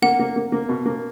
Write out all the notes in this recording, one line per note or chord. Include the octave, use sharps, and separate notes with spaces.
A#3 F#5
A#3
A#3
A#3
B2
A#3